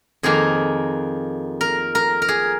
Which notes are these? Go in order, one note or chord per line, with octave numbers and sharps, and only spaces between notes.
F2 D#3 A#3 G#4
A#4
A#4
A#4
G#4